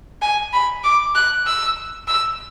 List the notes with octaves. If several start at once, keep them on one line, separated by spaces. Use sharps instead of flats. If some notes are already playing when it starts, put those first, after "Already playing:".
G#5
B5
D6
F#6
E6
E6